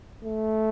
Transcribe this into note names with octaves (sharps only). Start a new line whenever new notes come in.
A3